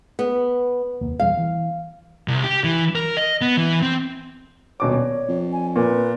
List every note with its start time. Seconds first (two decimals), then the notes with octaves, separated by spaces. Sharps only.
0.19 B3
1.01 F1 D#2 A#3
1.19 D#1 E2 G3 F5
1.38 E3
2.28 C2
2.43 G4
2.64 E3
2.95 A#4
3.17 D#5
3.41 B3
3.57 E3
3.82 C4
4.80 D#1 B2 C#5 D6
4.98 D5
5.28 F2
5.53 G#5
5.76 A#2 B4